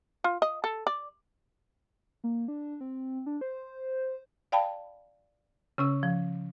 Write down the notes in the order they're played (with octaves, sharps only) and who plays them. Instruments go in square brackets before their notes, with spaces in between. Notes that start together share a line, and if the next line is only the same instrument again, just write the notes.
[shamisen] F4
D#5
A4
D5
[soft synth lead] A#3
D4
C4
D4
C5
[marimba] D5 F5 G5 A5 B5
C#3 C#4 E6
F3